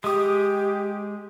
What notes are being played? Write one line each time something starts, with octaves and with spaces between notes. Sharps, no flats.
G#3 G4 D#6